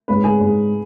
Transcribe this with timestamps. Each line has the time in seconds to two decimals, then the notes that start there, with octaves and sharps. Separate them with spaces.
0.08 G#2 G#3 C#4 B4
0.24 G#4
0.40 G#2 G#3 C#4